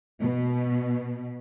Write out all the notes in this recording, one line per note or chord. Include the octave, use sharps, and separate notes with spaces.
B2